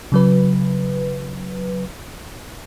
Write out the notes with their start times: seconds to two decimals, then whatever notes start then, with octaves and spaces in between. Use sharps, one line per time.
0.12 C#3 F#3 B4